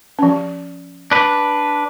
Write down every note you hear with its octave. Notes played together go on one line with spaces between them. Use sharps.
F3 C#4
D4 B4